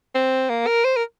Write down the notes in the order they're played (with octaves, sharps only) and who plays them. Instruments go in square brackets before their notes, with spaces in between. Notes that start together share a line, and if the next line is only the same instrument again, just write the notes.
[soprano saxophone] C4
A#3
A#4
C5
A#4